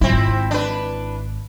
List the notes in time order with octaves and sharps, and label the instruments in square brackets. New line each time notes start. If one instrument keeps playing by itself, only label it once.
[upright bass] G#1 F4 [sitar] C4 E4
[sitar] D4 B4